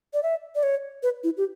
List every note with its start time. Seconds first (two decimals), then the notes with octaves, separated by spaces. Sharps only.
0.14 D5
0.23 E5
0.55 D5
0.63 C#5
1.03 B4
1.24 E4
1.37 G4